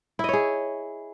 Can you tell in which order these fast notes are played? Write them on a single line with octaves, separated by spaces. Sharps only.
E4 D#5 C#5 G#4